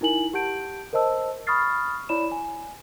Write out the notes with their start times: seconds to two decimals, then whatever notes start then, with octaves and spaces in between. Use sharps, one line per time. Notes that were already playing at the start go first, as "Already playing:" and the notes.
0.01 D#4 E4 A#4 G#5 F#7
0.34 G4 F#5 A5 G6 D7
0.93 A#4 C5 D#5 A5 E6
1.47 B5 C#6 D#6 F6 A6 C7
2.09 E4 C#5 D5 B5 E7
2.32 G#5